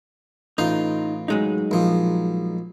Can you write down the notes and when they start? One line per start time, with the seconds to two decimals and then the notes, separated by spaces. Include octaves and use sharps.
0.58 A1 D#4 F4
1.28 F#3 G#3 D#4
1.71 A#1 F3